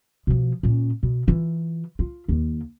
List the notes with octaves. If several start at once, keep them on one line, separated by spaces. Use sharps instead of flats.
B2 F3
A#2 C#4
B2
E3 F4
F4
D#2 D#3